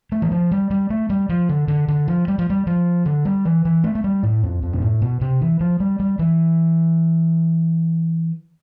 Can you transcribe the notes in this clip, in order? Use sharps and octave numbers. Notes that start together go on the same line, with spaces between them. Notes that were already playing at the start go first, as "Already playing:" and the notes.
A3
E3
F3
G3
G3
A3
G3
F3
D3
D3
D3
F3
G3
F3
G3
F3
D3
G3
E3
E3
A3
A3
G3
A2
F2
F2
B2
A2
B2
C3
E3
F3
G3
G3
E3